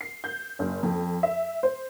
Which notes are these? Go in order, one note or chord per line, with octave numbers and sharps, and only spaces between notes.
C7
G6
F#1
F2
E5
C5